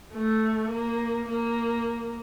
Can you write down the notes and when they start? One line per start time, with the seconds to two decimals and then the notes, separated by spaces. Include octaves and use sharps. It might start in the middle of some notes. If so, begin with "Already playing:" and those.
0.14 A3
0.71 A#3
1.29 A#3